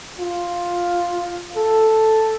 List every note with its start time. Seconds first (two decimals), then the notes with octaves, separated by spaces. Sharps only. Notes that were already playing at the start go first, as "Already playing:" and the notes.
0.19 F4
1.57 A4